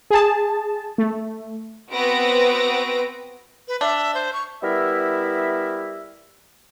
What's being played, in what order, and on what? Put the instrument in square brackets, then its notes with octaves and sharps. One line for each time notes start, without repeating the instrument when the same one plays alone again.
[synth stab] G#4 A5
A3
[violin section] B3 C4 F#4 B4 A#6 D7
[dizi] B4
[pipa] D4 [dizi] E5
[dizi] C5
C#6
[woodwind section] G3 B3 E4 A#4 E5